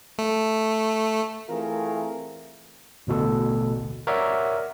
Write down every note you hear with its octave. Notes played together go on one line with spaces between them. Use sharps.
A3
E3 A3 C4 F4 G#4 A#4
A1 D2 B2 A4
A#4 C#5 D5 E5 F#5